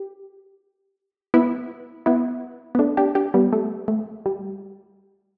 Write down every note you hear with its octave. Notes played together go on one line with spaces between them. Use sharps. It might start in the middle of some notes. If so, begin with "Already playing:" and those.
Already playing: G4
B3 E4
B3 E4
B3
A3 D4
D4 G4
D4 G4
G3 B3
A3
A3
G3